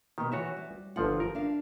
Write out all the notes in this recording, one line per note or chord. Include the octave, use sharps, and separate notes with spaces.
B2 D#3 G4
E3 F#4 C#5 E5
G3
G1 F3 F4 F#5
A#4
D4 F5